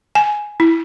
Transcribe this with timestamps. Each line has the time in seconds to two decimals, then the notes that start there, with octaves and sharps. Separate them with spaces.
0.15 G#5
0.60 E4